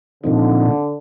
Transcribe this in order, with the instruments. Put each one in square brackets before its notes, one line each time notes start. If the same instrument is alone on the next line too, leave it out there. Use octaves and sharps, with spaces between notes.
[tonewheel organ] A#2 F3 C4 D#4 [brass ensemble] D3